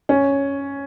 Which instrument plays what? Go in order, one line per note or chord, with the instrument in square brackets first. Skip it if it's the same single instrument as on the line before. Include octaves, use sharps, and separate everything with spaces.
[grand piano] C#4